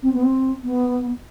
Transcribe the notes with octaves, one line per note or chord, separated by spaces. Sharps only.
C4
B3
C4
B3